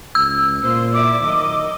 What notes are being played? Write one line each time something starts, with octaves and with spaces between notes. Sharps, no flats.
C#2 E6
A#2 F4 C5
E4 D5 E5 D6
D#3 F#3 A#4 D#5